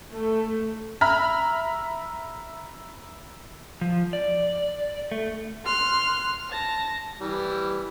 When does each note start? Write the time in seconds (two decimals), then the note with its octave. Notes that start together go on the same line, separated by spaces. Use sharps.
0.12 A3
1.01 E5 A#5 B5 F6
3.81 F3
4.13 D5
5.12 A3
5.64 C6 F6 F#6
6.50 A5 A#6
7.21 E3 G3